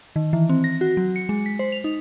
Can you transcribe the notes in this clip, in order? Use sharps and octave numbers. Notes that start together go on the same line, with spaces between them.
D#3
E3
C4
A#6
F#4
F#3
C#7
G#3
B6
C5
F7
D#4